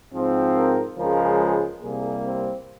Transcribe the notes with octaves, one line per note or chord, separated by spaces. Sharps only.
G#2 F3 C4
A#4
C#2 C#3 F3 G#3 A#4
C2 C3 G3 A#3 G#4
C4